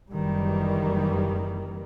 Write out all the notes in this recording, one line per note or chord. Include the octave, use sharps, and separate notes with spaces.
F#1 D#3 E3 G3